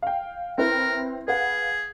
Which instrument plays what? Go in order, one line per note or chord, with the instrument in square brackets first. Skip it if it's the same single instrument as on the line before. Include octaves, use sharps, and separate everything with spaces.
[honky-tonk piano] F5 G5
[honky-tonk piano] C4 E4 B4 [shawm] A#4
[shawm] G#4 [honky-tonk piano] B4 F5 F#5